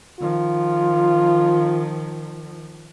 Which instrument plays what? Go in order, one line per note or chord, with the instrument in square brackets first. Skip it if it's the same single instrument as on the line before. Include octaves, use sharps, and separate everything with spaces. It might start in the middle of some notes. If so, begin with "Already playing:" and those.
[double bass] D#3 F3 [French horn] F4